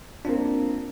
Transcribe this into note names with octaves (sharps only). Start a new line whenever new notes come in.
A#3 C4 D4 F4